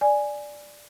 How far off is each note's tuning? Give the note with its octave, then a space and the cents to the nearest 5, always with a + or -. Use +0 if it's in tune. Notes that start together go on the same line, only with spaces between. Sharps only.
D5 +0 G#5 +0